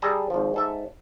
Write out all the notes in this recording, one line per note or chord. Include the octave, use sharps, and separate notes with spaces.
G3 G#4 A4 A5 A#5
G#1 F3
G#2 A4 E5